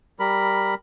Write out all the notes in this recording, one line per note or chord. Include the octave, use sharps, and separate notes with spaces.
G3 A#4 B5